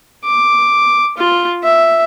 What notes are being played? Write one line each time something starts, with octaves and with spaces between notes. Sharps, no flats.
D6
F4
E5